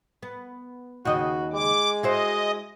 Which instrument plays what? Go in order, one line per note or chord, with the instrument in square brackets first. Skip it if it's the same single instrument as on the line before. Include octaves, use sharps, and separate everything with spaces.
[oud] B3
[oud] D#2 C#3 D#5 [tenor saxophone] F#4
[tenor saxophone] G#3 [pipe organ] D6
[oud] E4 F#4 C5 [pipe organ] D#5